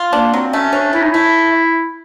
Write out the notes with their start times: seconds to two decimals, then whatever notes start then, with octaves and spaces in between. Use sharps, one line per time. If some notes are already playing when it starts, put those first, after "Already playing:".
Already playing: F4
0.13 A#3 D4
0.34 F#3 C4
0.53 A3 C#4
0.73 C#4 D4
0.93 C#4 E4
1.02 D#4
1.11 A3 E4